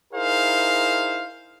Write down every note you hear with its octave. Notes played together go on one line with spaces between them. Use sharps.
D#4 E4 G#4 A#4 C5 F5